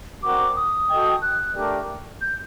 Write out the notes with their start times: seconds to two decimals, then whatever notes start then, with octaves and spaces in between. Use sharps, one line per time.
0.23 C4 F#4 A#4 D5 F#5 D6
0.56 D#6
0.90 F#4 A4 D#5 G5
1.22 F#6
1.55 A3 D4 G4 A#4 D5
2.21 G6